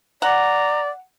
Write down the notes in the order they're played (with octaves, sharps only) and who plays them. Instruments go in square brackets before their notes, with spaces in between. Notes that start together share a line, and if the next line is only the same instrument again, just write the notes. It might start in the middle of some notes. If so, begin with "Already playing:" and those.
[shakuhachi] D5 [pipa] F#5 [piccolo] A#5